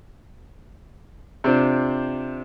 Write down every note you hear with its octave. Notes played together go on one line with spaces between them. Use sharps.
C3 C4 D4 F4